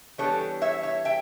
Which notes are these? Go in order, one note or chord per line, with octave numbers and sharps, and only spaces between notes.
E3 G3 B3 D4 A4 C#5
C#5 E5
C#5 E5
E5 G5